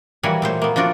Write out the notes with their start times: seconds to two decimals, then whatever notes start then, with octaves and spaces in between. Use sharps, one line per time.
0.23 E3 F#3 G3 A#3 F#5 G#5
0.42 A#2 A3 C5
0.62 A#3 B3
0.76 F3 D4 F4 F#4 D5